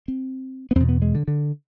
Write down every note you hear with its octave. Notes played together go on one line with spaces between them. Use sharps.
C4
B3
E2 B2 C4
B3
G#3
D3
D3